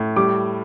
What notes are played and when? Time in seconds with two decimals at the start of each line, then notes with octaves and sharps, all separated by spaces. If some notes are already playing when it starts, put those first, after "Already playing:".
Already playing: A2
0.16 G3 D6